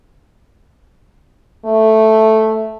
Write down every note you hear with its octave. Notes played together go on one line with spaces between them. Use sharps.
A3